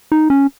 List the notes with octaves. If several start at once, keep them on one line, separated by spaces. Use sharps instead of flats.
D#4
C#4